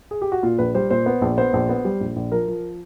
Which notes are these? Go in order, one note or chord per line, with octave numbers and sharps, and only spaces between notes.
G#4
G4
F#4
A#2 F4
A#1 B4
G3 C5
A#2 C5
B3
A#1
B3 C5
A#1
B3
G3
A#1
A#1
F3 A#4
F3